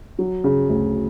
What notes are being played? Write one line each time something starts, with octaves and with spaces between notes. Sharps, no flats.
F#3
C#3
D2